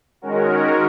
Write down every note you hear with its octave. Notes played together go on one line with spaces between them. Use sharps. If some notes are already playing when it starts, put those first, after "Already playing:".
D#3 G#3 C#4 F#4 A#4